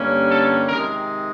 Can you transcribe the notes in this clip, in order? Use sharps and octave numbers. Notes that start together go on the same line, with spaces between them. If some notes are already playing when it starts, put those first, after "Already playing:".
Already playing: G2 D3 G3 A#3 C#4
A4
C3 D#3 G#3 A#4